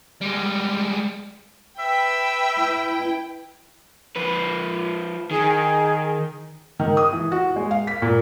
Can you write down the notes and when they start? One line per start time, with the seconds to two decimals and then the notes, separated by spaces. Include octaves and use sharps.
0.21 G3 G#3
1.79 B4 E5 G5
2.58 E4
4.16 F3 B4
5.31 D#3 G#4
6.80 D#3
6.97 D#6
7.13 E3
7.32 F#4
7.56 G#3
7.71 F5
7.87 B6
8.02 A#2